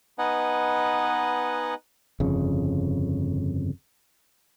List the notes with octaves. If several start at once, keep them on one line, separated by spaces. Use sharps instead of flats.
B3 D#4 B4 D#5 F#5 G#5
G1 F2 C#3